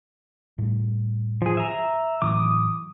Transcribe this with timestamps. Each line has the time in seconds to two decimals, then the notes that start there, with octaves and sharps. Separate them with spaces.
0.58 A2 G3
1.42 F3 G#4
1.57 E5 A#5
2.22 A2 E3 F#3 D6 D#6